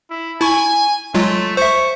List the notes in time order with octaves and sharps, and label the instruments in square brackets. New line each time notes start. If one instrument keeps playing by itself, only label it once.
[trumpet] E4
[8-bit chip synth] E4 C#6 [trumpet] G#5
[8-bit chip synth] F#3 G#3 F4 [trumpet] A3
[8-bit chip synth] C5 E5 [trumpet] C#6